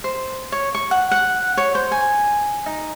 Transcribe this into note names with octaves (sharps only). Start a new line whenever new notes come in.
C5
C#5
C#6
F#5
F#5
C#5
C5
G#5
D#4